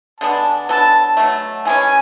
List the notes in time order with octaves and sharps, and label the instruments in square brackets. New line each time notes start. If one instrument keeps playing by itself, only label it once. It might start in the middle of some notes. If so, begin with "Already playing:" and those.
[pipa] D3 G#3 B3 D4 [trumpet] A5
[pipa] F#3 B3 D4 A4 [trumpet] A5
[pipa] B2 F#3 A3
[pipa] E3 G#3 C#4 [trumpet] G#5